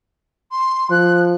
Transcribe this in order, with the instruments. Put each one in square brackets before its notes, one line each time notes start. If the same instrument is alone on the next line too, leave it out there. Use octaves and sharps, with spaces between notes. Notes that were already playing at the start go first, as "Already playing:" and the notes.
[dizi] C6
[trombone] F3 [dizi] F#6